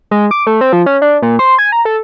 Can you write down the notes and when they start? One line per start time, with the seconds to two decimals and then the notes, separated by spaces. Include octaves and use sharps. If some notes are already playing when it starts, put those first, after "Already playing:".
0.11 G#3
0.31 D6
0.47 A3
0.61 C4
0.73 F3
0.86 C#4
1.02 D4
1.22 A#2
1.39 C5
1.59 G#5
1.72 A#5
1.85 A4